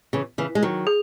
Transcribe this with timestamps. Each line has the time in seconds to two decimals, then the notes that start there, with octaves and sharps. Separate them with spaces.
0.13 C#3 E3
0.38 C#3 E3
0.55 G#3
0.62 D#3 F#3
0.87 G#4